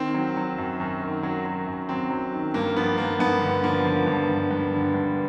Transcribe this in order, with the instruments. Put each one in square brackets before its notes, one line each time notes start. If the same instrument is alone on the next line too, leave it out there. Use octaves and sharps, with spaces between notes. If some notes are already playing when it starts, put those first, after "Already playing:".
Already playing: [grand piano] D#3 C4
F#3
F#3
F#2
F#2
D#3
F#3
F#3
F#2
F#3 C4
F#3
D#3
G2 A#3
F3 B3
G2 A#3
G2 B3
D3
F3 A#3
F3
G2
G2
G2
D3
G2